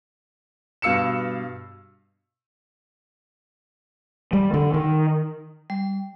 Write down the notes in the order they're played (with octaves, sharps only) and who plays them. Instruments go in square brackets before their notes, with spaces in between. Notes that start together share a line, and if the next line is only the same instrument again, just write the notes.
[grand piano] G2 B2 F5 E6 C#7 E7
[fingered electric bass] G3
D3
D#3
[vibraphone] G3